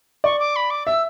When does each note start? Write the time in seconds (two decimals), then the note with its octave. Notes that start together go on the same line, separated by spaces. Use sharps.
0.24 D5 C#6
0.39 D6
0.56 B5
0.70 D6
0.86 E5 E6